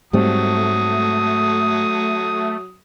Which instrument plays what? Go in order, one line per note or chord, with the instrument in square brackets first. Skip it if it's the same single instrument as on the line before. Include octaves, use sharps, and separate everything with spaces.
[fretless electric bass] G#2 G3 C4 [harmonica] F#3 D#6 [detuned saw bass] A3